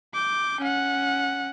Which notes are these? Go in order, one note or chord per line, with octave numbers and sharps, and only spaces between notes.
D6 G6
C#4 F#5